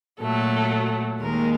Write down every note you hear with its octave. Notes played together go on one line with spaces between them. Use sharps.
A#2 F#3 A3 A4
D#2 D#3 G#3 A#4